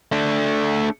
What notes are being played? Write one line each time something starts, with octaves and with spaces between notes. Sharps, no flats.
A3 D4